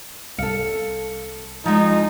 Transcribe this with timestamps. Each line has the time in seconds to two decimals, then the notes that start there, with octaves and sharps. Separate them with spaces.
0.38 C2 A4 F5 C#7
1.66 F3 G#3 D#4